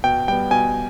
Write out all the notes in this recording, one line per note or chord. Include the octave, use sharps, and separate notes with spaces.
B2 G5
G3 B3 G5
B2 G#5